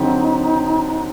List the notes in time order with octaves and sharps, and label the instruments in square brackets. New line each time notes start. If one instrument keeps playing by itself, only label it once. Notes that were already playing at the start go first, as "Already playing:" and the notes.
Already playing: [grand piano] D3 F#3 C4 G4 [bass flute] D#4